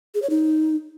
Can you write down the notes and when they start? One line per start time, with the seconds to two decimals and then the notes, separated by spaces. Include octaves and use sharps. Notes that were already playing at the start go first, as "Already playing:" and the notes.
0.15 G#4
0.22 C#5
0.30 D#4